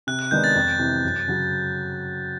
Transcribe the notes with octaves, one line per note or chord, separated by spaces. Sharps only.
C3 F#6
F#6
D#3 G#3 B3 D4 G6
A6
F2
C3 E3
F#2
C#3 F#3